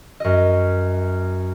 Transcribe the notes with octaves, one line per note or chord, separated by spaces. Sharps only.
F#2 D#5